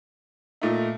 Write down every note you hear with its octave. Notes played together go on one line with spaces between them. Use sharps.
A#2 A3 D#4